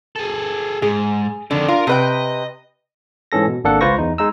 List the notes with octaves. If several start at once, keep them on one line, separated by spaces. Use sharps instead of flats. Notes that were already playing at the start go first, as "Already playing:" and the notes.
G#4 A4
G#2 G#4
F2 D3 D#3
F4 A#4 A#5
C3 B4 D#5 G5
G#2 E3 C#4 A4 A#6
B2
G#1 A#3 D4 A4 F#5
C#2 F4 B4 C5 C#6 A#6
E2 D#4
G#3 D#4 A#5 E6